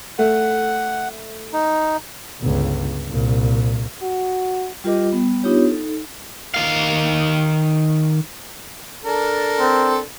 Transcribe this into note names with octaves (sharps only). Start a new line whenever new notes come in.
A3 F#5
D#4
G1 C#2
C2 A#2
F#4
G3 F4 G4 A#4 D#5 D6
G3 B3
B3 D4 D#4 F4 G4 C#5
D#4 A4
D#3 F5
D4 A4 A#4
C4